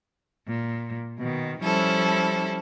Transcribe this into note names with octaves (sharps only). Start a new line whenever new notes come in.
A#2
B2 D#3
F3 G3 C#4 E4 A4 C5